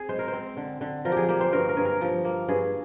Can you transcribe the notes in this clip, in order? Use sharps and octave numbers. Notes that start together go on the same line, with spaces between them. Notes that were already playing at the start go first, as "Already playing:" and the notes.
Already playing: C4 G#4
G#3 C5
A#4
C5
C4
D3
D3
F3 A#4
G4
G#4
A#3 G4
C5
G2 A#4
A#4
G2 G#4
A#4
F3
A#3
G2 G#4